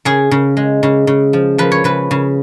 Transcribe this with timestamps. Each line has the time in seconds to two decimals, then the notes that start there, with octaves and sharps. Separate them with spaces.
0.05 C#3 G#4
0.31 C#3
0.57 G#3
0.83 C#3
1.07 C#3
1.33 F3
1.58 F3 B4
1.72 C#5
1.84 C#3 B4
2.11 C#3